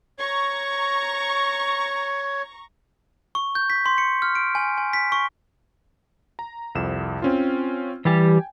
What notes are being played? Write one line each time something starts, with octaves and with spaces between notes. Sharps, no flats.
C#5 A#5 C#6
C#6
G6
B6
C6
C#7
F6
D7
G#5
G#5
B6
C#6
A#5
C2 F2 E7
C4 C#4 F4
E3 G3 G4 G5 G#5